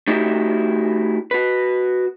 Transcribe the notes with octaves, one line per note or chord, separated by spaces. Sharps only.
A3 D#4 E4 F#4 G4
F#4 B4